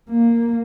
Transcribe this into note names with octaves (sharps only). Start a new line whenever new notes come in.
A#3